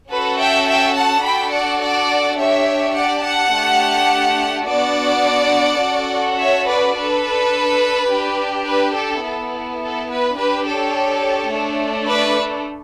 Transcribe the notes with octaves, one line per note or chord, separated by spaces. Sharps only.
C#4 F#4 A4 B4
E5 G5
E5 G5
F#5 A5
D4 F#4 A4 G5 B5
D5 F#5
D5 F#5
D4 G4 C#5 E5
D5 F#5
F#5 A5
A3 D4 G4
B3 D4 F#4 D5 F#5
C#4 F#4 A4
C#5 E5
B4 D5
D4 A4 B4
D4 G4
B4
A4
B3 E4 A4
A4
B4
D4 G4 B4
A4 C#5
A3 D4 A4
B4 D5